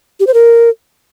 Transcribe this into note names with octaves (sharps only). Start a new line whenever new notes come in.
G4
C5
A#4